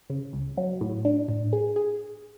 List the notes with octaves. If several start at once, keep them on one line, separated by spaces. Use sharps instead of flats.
C#3
C#2
F#3
A2
D4
A2
G#4
G#4